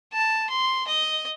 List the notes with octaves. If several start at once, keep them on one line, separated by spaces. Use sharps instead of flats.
A5
C6
D#5